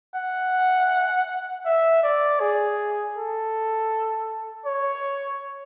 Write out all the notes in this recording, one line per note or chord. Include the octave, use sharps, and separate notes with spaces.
F#5
E5
D5
G#4
A4
C#5